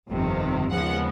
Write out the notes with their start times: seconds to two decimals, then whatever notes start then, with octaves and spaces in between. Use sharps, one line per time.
0.08 G1 F2 C3 D#3
0.71 D#2 C#3 F3 G#3 B3 F#5